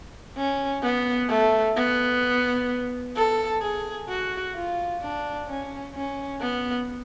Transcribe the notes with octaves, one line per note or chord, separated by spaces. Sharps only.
C#4
B3
A3
B3
A4
G#4
F#4
F4
D4
C#4
C#4
B3